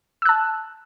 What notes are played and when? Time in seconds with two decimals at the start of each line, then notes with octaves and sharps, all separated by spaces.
0.22 E6
0.25 F#6
0.29 A5